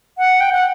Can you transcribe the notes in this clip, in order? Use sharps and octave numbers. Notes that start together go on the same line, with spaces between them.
F#5
G5
F#5